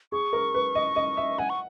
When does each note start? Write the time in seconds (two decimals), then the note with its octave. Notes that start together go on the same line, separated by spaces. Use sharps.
0.12 G#4 C#6
0.33 A#4
0.54 B4
0.75 D#5
0.96 D#5
1.17 E5
1.38 F#5 G#5
1.50 C#6